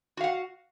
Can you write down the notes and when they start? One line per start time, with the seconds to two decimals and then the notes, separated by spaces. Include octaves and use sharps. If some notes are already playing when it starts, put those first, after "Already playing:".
0.17 F#4
0.21 F5
0.24 F#5